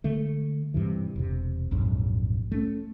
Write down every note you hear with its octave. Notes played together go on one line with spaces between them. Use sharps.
D3 G#3 A3
G2 C3 E3
E1 C3
A#1 F2 G#2 F#3
A3 C#4